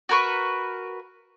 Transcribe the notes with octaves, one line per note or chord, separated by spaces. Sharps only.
F#4 A#4 B4 C#6